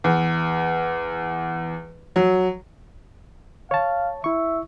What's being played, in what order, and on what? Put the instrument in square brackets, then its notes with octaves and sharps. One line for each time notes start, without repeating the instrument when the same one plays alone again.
[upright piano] E2
F#3
[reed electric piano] C#5 A5 [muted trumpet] F5
[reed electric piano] E4 C#6 [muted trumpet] E5